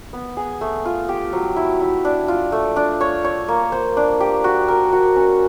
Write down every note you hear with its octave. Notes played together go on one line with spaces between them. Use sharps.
B3
G#4
A3
F4
G4
F#3
E4
E4
D4
F4
A3
D4
C#5
C#5
A#3
C5
D4
G4
F#4
A#4
F#4
C#4